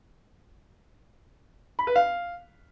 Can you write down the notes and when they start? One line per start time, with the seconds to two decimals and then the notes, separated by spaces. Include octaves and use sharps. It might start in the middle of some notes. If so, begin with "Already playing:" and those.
1.79 B5
1.87 B4
1.96 F5